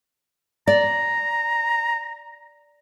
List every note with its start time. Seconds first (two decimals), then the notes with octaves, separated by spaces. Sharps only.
0.67 D5 A#5